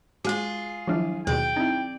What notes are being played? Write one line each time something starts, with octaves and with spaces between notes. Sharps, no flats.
G#3 F4 F#4 G#4
D#3 F3 F#3 G#3 D4 E4
D#2 B2 G#4 D5 G5
C4 D#4 E4